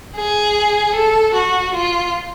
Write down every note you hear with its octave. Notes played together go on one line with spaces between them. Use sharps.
G#4
A4
F#4
F4